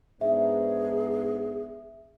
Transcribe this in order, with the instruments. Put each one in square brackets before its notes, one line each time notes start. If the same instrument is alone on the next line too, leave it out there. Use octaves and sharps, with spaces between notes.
[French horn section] G#2 B3 D4 [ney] G#4 [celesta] E5